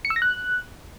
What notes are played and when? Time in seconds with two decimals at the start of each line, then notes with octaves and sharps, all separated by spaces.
0.05 C#7
0.10 E6
0.16 A#6
0.22 F#6